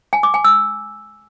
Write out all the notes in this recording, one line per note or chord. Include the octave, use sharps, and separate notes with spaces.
G#5
D6
G#5
E6